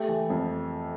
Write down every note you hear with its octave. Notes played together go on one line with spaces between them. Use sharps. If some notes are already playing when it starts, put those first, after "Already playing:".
Already playing: A3 G4
E3
F2